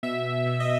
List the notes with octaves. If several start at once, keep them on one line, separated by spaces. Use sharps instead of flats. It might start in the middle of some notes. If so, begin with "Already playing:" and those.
B2 E5
B2
D#5